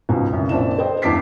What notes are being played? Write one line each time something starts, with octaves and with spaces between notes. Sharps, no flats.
C#2 G#2 B2
C2 F#2 C#3
A#1 F#2 C4 D4 E4 E7
B4 C5 D#5 G5
E2 G2 A5 D6 B6 C7